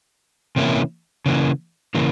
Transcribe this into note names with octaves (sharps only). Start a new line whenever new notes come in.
C3 E3 A#3 C#4 E4
C#3 E3 A#3
C#3 E3 A#3